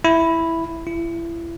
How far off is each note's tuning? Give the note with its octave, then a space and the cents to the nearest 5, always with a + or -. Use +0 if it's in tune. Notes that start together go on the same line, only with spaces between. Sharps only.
E4 +0
E4 +30